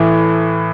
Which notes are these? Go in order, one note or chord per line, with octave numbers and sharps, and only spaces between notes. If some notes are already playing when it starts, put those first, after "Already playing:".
Already playing: A2 E3